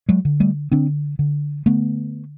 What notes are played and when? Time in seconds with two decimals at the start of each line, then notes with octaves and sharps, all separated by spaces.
0.09 F#3 G#3
0.25 D3
0.40 G3 A3
0.72 D3 C4 D4
1.19 D3
1.66 D3 A3 B3